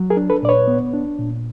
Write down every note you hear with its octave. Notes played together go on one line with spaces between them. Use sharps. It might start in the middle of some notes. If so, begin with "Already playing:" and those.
Already playing: F#3
G#4 A#4
D4
A4 B4
A#2 D5
B4 C#5
B3
D4
A#2